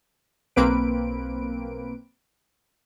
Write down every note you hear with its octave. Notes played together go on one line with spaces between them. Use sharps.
B1 A#3 C4 B4 D7